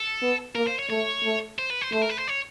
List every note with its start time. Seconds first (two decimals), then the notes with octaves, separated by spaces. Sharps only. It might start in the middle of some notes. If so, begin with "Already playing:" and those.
Already playing: A4
0.22 B3
0.55 A#3 A#4
0.67 C5
0.79 C#5
0.90 A3 C#5
1.24 A3
1.59 C5
1.70 B4
1.81 C5
1.93 A3 C5
2.02 A#4
2.09 B4
2.19 C5
2.28 C#5